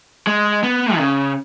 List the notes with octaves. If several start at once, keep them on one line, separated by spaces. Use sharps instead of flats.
G#3
B3
D#3
C#3